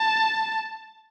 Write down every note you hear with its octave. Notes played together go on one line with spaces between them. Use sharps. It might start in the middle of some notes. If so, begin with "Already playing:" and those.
Already playing: A5